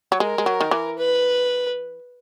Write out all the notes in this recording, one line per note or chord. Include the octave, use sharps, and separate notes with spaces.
F#3
G#3 A#4
G#3
F#3
D#3
E3
B4